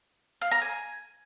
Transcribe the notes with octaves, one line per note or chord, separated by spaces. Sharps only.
F5
A#5
G#5